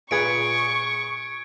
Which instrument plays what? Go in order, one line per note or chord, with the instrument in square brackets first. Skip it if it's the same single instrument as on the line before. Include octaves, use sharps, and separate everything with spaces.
[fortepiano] A#2 G#4 B4 [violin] C#6 [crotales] G#6 C#7 D7